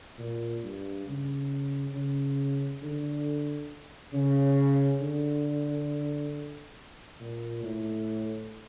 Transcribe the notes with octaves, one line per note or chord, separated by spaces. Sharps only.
A#2
G2
C#3
C#3
D3
C#3
D3
A#2
A2